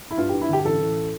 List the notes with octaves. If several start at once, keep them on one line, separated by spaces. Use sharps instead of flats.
E4
G2 F4
G2 G4
E4
D3 G4
G4
A1 A4
A1